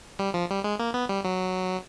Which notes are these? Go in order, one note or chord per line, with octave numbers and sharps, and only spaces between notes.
G3
F3
G3
G#3
A#3
B3
G3
F#3